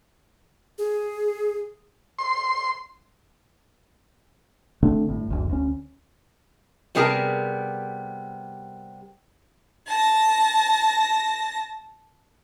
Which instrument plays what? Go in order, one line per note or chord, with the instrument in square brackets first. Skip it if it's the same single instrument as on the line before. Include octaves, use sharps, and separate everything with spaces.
[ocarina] G#4
[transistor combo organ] C6
[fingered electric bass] D3 A3 C4 D4
G1 A2
F#1 D2
D2 C#4
[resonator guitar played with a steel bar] C3 G3 B3 G#4 A#4 A5
[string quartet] A5 A#6